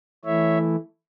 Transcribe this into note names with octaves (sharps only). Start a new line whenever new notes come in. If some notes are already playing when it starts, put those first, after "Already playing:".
E3 A3 E4 C#5 E5